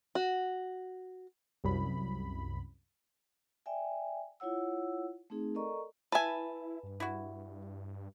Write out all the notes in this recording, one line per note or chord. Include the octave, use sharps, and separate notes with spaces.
F#4
C2 F#2 B5
D5 E5 G5 G#5
E4 F4 C#5 F#5 E6
A3 C4 D#4 G#4
A4 A#4 D5 D#5 A#5 C#6
E4 B4 E5 G#5 A5
G2
E4 F#4